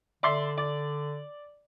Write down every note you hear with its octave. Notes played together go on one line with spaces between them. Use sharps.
D3 D5 E5 C6
D5